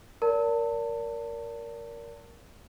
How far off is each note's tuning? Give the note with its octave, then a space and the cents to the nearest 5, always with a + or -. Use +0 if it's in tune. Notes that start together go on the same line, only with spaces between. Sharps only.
A#4 +0 D5 -40 A5 +30